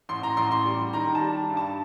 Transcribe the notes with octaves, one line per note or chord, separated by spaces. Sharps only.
A1 C6
A#5
A1 C6
C6
G3
D#3 A#5
A5
G3
G2
A5